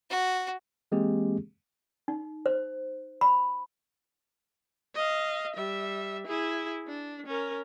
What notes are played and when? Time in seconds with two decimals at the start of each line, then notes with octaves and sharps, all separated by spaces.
0.10 F#4
0.92 E3 G#3 A#3 C4 G4 G#4
2.08 D#4
2.46 C5
3.21 B5
4.95 D#5 F5
5.55 G3 E5
6.27 E4 G#4
6.88 D4
7.26 C#4 A#4